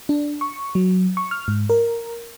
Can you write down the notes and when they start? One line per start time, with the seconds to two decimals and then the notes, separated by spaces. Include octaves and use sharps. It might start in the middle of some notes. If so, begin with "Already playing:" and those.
0.09 D4
0.41 C#6
0.75 F#3
1.17 C#6
1.31 F6
1.48 G#2
1.70 A#4